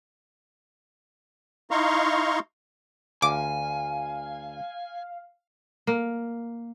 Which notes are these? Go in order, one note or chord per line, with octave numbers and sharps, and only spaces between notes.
D#4 E4 F5 A#5 C6 C#6
D2 F5 G#5 D6
A#3